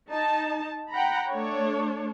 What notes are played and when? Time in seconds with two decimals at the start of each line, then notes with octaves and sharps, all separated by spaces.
0.11 D#4 A5
0.92 F#5 G5 A#5 B5
1.29 A3 D4 C#5